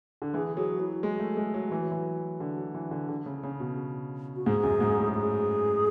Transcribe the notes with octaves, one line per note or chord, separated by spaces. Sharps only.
D3
E3 G#4
F#3 G#4
F#3 E4
G#3
A3
G#3
F#3
E3
F#3
E3
D3
F#3
E3
D3
D3
C#3
C#3
B2
F#4
G#2 G#4
F#2
G#2
A2
G#4